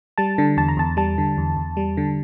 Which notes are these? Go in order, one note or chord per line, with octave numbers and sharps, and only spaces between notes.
G3 A5
D3
E2 A5
A#5
E2 A5
G3 A5
D3
E2
E2
G3
D3